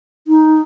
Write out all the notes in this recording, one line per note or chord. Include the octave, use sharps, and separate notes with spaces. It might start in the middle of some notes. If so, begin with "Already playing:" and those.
D#4